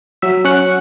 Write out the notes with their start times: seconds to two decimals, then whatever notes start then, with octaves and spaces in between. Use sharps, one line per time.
0.22 F#3 E5
0.44 C#4 F#5